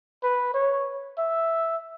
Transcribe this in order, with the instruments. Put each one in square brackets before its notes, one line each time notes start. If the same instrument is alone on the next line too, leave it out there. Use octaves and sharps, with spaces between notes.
[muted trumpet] B4
C#5
E5